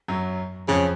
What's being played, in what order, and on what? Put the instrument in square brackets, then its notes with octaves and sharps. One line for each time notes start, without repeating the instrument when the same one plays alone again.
[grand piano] F#2 F#3
[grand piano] F2 F3 [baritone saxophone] C#3